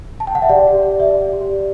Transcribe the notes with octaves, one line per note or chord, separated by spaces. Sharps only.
A5
G5
F#5
E5
G4 D5
G4
D5
D5 E5
G4
G4
D5